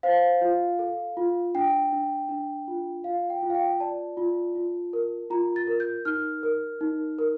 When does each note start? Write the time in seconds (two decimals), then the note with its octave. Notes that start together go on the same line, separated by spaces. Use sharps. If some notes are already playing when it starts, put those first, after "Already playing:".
0.03 C5 F5
0.41 F4
0.79 A4
1.17 F4
1.55 D4 G5
1.92 D4
2.29 D4
2.67 F4
3.04 F4 F5
3.30 G5
3.43 F4
3.50 F5
3.55 G5
3.80 D5 A5
4.17 F4
4.55 F4
4.93 A#4
5.30 F4 A#5
5.56 A6
5.67 A#4
5.80 G6
6.05 D#4 F6
6.43 A#4
6.81 D#4
7.19 A#4